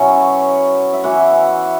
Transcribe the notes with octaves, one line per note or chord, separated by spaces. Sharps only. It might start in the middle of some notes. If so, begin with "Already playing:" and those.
Already playing: B2 F#3 B3 C#4 E4 C#5
E5
E3 B3 E4 F#4 F#5